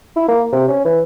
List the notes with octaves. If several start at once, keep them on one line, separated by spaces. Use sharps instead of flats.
E4
A#3
C3
C#4
E3